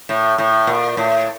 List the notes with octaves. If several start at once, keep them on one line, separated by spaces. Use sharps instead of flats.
A2
A2
A#2
A2